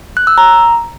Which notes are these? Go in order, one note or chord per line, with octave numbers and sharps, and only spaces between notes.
F#6
E6
A#5